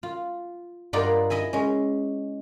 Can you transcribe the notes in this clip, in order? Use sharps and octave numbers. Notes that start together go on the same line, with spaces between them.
F4
G2 D#4 F4 A#4 D5 F#5
E4 D#5 E5 G#5
G#3 C#4